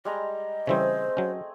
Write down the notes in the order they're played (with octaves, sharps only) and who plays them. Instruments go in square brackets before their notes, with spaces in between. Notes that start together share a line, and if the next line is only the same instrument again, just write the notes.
[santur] G3 G#3 A#5 [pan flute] D#5
[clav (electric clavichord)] C#3 E3 G3 [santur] A3 C4 G#4 [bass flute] C5
[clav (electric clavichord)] F#3 C#4